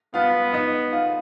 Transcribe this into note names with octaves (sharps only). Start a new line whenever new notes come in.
B3 F4 F5
D#4 D#5
F4 F5